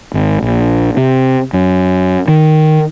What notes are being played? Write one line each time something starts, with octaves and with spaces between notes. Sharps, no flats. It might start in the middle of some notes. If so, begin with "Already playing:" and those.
G#1
A#1
C3
F#2
D#3